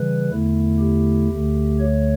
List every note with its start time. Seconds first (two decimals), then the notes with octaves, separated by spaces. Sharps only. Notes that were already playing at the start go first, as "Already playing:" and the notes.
Already playing: C#3 E3 G3 B4
0.29 E2 D3 A3 E4
0.79 G4
1.30 D2 D3 A3
1.80 C#5